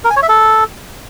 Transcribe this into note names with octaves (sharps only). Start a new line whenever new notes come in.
A#4
G#5
C#5
E5
A4